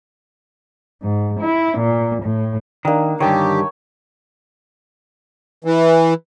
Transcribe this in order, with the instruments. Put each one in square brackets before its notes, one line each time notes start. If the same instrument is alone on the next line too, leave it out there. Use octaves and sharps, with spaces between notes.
[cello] G#2
E4
A#2
A2
[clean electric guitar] D#3 [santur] A#3 D4
[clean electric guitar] G2 D3 D#3 [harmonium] G4 [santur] C#5 G5 G#5
[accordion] E3